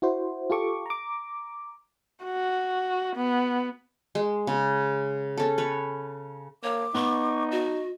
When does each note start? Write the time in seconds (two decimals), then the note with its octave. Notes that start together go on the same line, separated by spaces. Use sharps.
0.02 E4 F#4 C5
0.50 F4 G4 A4 C#6 D6
0.86 A#5 D6
2.25 F#4
3.16 B3
4.15 G#3 C6
4.47 C#3
5.37 C#4 A4
5.58 B4 C#5
6.63 A#3 C#5 D6
6.94 B3 D#4 C#6
7.51 F#4 D#5